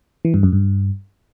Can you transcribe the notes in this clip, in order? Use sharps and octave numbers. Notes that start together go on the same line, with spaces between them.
E3
G2
F#2
G2